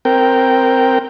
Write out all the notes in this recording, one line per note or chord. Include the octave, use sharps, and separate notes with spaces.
C4 A#4 G5